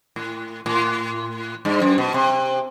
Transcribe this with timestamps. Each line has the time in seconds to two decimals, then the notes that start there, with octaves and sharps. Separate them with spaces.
0.16 A2
0.66 A2
1.65 G2
1.82 F#2
1.98 B2
2.14 C3